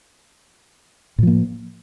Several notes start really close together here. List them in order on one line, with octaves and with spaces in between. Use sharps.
A2 F3 A#3